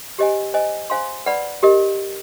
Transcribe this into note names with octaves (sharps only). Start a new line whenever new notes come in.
G4 C5 D#5 G#5
C5 D#5 G#5
C5 F5 G#5 C6
B4 D5 F#5 B5
G4 A#4 D#5